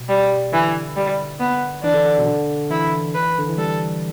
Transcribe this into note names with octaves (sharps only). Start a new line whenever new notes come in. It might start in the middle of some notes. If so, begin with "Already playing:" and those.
Already playing: B2
G3
D3 E3
G3
B3
E3 D4
D3
D3
B2
D3
E3 E4
B4
D3
E3
G3 A4